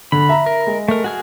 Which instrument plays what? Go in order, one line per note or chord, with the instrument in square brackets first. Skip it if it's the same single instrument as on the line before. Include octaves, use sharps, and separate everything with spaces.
[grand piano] D3 [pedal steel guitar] B5
[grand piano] E5 A#5
[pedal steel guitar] A#4
[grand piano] G#3
[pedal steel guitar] A3 A#4
F#4 G#4 F6